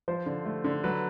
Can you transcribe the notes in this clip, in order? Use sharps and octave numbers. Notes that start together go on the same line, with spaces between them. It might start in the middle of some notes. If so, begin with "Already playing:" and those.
F3 C5
D3
A3
D3
F#3 B4